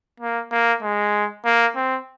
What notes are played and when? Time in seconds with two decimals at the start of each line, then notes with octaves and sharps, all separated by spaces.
0.20 A#3
0.51 A#3
0.82 G#3
1.45 A#3
1.76 C4